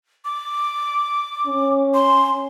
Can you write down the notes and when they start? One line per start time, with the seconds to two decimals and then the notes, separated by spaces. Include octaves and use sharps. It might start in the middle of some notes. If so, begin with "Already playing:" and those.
0.25 D6
1.47 C#4
1.94 C6